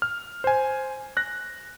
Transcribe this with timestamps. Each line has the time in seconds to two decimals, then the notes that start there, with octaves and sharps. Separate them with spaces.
0.02 F6
0.44 C5 G#5
1.17 F#6 A#6